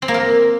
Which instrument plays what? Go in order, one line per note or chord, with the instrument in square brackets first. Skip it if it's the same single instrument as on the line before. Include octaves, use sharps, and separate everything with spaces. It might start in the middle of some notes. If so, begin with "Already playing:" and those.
[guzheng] C4
A#3
A#4